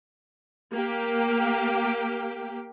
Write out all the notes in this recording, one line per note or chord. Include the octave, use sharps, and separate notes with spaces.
A#3 G4